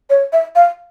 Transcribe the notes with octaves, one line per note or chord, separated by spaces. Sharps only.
C#5
E5
F5